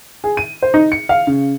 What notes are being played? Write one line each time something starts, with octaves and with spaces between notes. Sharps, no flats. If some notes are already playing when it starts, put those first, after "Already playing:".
G#4
D#7
C5
D#4
C#7
F5
C#3